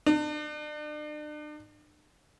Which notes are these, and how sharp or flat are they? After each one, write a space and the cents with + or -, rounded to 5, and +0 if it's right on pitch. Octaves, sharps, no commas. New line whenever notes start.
D4 +40